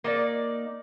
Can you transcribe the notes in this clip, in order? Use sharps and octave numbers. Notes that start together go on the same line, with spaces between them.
A#3 D#4 D5